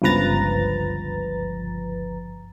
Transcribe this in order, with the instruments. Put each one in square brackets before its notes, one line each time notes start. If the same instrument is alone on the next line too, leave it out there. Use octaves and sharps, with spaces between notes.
[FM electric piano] G1 C#2 F3 B4 A#5 A6